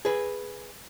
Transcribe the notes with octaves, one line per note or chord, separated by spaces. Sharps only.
G#4 B4